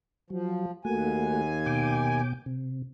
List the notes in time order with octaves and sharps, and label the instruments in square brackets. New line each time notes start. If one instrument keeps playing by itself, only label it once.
[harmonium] F3 [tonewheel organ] F#3
[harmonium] D#2 G#5 [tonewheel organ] A3 A#3 F#4
[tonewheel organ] B2 G5 D6
C3